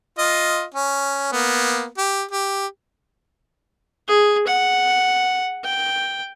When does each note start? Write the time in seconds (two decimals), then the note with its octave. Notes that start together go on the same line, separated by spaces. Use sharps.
0.18 F4 D#5
0.74 C#4
1.32 A#3 B3
1.98 G4
2.31 G4
4.08 G#4
4.47 F#5
5.64 G5